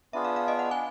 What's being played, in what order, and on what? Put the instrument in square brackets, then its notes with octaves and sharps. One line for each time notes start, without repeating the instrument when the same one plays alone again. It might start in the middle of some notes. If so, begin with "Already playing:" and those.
[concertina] B3 D4 F4 G#4 [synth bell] E5
[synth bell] F5
F5
D#5
F#5
G#5